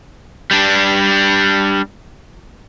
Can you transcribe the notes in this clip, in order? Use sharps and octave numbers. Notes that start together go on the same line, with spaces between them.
G3 D4